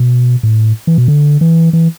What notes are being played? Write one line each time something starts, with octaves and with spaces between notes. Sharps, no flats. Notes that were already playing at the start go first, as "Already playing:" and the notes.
Already playing: B2
A2
E3
B2
D3
E3
E3